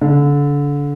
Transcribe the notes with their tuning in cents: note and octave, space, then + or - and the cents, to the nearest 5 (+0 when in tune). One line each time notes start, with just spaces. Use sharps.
D3 -30